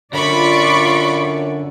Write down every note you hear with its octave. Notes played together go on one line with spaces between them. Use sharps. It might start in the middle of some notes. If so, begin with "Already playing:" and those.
F#2 D3 F4 D5 B5 C#6 D6